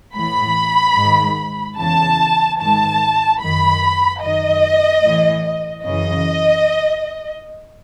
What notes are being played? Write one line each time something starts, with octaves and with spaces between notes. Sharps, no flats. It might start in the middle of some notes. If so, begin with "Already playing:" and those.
A2 E3 B5
G#2 D#3
E2 C#3 E3 A5
G#2 D#3 A5
F#2 D#3 B5
F#2 D#3 D#5
A2 E3
F#2 C#3 E3 D#5